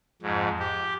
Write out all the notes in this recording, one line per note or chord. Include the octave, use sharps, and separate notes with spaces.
F2 G#2
G4